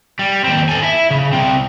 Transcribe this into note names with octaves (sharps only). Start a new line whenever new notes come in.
G3
D#2 C4
A4 G#5
E4 E5
C#3
C2 C4